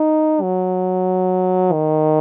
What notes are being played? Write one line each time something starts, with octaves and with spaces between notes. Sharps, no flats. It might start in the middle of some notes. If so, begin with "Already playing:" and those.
Already playing: D#4
F#3
D#3